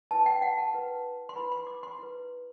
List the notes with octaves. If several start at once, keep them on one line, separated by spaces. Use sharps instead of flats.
E4 B4 A5
G5
F#5
A5
E4 B4
C6
E4 B4 B5
C6
D6
C6
E4 B4